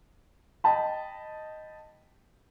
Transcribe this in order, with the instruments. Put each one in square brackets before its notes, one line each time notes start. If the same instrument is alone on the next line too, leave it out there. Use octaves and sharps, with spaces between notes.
[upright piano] D#5 G5 A5 B5